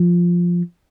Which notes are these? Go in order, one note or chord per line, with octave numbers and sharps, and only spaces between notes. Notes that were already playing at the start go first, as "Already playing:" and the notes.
Already playing: F3